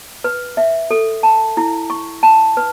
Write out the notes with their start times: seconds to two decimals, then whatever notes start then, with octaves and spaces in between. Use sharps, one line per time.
0.24 B4
0.57 E5
0.91 A4
1.23 A5
1.57 E4
1.90 C#6
2.23 A5
2.57 B4